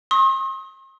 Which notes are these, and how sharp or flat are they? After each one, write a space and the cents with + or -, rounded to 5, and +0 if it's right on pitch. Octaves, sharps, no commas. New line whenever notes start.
C6 +45 D#6 +35